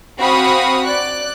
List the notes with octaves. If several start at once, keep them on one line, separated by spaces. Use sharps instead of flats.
C4 F#4 F5 B5 C#6 D#6
D5 F#6